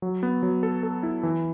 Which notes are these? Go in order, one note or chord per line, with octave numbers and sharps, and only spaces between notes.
F#3
B3
F#3
A4
A4
E4
E3